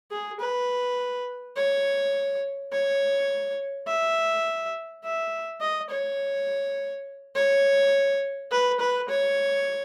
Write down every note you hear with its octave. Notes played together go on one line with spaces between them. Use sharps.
G#4
B4
C#5
C#5
E5
E5
D#5
C#5
C#5
B4
B4
C#5